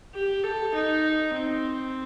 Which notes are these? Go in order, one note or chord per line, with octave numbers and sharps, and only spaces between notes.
G4
A4
D#4
C4